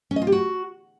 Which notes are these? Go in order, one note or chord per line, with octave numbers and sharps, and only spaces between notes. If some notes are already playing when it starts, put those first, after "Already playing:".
C#4
D#5
F4
G4
F#4